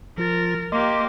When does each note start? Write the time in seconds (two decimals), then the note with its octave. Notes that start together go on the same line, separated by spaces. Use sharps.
0.18 F3 F4 A#4 A6
0.72 A#3 G4 D#5 C6 D6